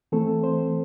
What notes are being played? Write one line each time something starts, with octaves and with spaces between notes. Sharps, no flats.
E3 A3 C4 A4
C5